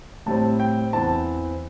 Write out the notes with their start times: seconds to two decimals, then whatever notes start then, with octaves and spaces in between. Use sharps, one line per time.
0.26 A2 G3 C4 A5
0.60 G5
0.93 E2 E3 C4 A5